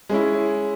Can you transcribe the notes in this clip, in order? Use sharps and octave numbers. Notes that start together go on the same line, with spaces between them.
G#3 C#4 E4